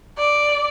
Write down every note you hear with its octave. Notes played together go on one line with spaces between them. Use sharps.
D5